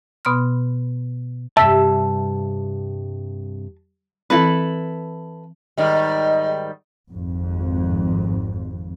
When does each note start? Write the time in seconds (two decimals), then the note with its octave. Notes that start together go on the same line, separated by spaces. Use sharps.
0.25 B2 B3 B5 C6 F6
1.57 G2 C3 E5 A5
4.30 E3 C4 E4 A4 B4
5.78 G#2 D#3 G3 D#5
7.12 G#1 F2